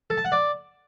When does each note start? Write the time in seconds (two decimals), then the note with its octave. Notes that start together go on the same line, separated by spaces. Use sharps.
0.10 A4
0.17 A5
0.25 F#5
0.32 D5